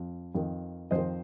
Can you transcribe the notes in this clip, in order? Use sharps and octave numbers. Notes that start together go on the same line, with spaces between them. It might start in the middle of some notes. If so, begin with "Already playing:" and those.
Already playing: F2
F2 D#3
F2 D#3 C5 D#5